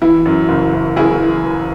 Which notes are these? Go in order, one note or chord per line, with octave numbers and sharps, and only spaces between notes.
E3 E4
F#2
F#1
F#1
F#1 E4 G#4
E3
E3